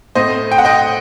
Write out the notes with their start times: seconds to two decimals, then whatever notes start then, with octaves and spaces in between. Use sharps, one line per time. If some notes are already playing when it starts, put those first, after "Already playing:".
0.15 A2 A3 C4 C5 D#5
0.52 G5
0.58 F#5
0.65 D#5 G5